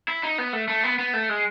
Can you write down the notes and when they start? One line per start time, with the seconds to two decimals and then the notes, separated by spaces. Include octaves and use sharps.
0.08 E4
0.23 D#4
0.38 B3
0.53 A3
0.68 A3
0.84 B3
0.99 B3
1.14 A3
1.29 G#3